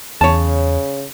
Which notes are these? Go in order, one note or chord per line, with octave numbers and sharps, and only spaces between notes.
E2 C#3 C#5 A5